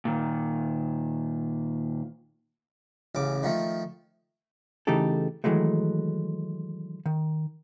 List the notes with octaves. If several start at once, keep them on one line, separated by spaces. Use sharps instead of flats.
A#2 D#3
A1 C#3 D6
D#3 F3 A3
C#3 E3 A3 D#4 G4 A4
D#3 E3 F#3 G#3 A3
D#3